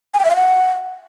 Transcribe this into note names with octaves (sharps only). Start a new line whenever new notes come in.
G#5
G5
E5
F5
F#5